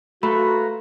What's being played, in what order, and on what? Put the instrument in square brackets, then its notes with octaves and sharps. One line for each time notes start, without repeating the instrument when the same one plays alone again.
[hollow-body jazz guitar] A3 [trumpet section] F4 B4 A#5 [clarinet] F#4 [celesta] B5